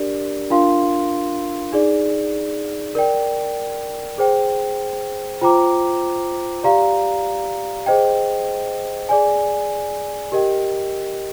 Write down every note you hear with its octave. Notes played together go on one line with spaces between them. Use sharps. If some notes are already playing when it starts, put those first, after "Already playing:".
Already playing: D4 G4 A#4 D5
D4 F4 A#4 F5 C6
D#4 G#4 D5
A#4 D5 G5
G#4 C5 G5
F4 C5 G5 A#5 D6
G4 D5 F5 A#5
G#4 C5 D#5 G5
G#4 D5 G#5
G4 A#4 D#5 G5